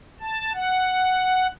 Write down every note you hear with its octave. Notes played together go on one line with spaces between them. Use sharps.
A5
F#5